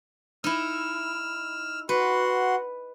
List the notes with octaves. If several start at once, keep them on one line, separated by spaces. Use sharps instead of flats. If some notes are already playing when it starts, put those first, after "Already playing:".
D#4 E4 E6 F6
F#4 B4 F#5 C6